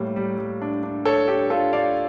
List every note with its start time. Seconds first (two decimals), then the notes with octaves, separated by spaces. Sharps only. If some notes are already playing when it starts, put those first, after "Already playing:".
Already playing: A2 G3 A#3
0.16 G3
0.38 G3
0.62 D4
0.83 D4
1.05 D4 A4 C#5
1.28 D4 G4
1.50 D4 F4 A4
1.73 D4 D5 F5